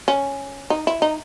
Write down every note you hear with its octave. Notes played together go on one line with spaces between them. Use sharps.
C#4
D#4
E4
D#4